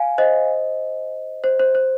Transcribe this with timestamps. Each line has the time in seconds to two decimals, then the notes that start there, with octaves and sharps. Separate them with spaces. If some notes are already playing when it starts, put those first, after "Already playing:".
Already playing: F5 G#5
0.18 C5 D#5
1.44 C5
1.60 C5
1.75 C5